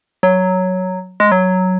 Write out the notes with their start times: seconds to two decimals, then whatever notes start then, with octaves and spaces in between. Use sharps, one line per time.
0.23 F#3
1.20 G#3
1.32 F#3